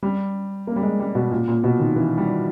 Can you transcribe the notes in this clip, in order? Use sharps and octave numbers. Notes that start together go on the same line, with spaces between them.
G3
A#3
G3
G#3
G3
B2
A#2
A#2
B2
D#3
E3
G3